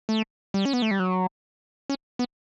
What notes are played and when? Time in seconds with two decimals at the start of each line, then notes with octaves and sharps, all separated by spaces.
0.09 A3
0.54 G3
0.65 C#4
0.73 B3
0.82 A3
0.91 G3
0.99 F#3
1.90 C#4
2.19 B3